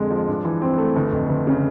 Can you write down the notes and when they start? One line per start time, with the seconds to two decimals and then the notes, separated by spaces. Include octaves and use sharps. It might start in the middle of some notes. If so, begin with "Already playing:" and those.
Already playing: F2 D3 G#3
0.10 F3
0.28 G2
0.45 E3
0.62 C4
0.78 A3
0.96 G1
1.12 F2
1.29 G1
1.47 C#3